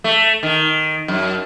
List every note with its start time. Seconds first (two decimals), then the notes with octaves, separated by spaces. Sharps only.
0.04 A3
0.43 D#3
1.08 F#2